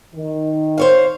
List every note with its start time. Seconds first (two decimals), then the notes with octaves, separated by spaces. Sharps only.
0.14 D#3
0.78 C5 C#5 F5